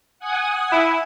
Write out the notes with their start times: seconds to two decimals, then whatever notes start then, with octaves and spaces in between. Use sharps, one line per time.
0.19 F#5 G#5 D#6
0.72 E4